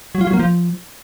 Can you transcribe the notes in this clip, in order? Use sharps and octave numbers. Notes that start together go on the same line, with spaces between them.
F#3
F4
F#3
A#3
F3